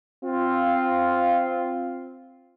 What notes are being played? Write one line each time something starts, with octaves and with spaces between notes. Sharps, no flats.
C4 F4